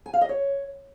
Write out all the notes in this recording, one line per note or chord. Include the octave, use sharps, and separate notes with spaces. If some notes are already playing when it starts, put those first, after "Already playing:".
G#5
F5
D#5
C#5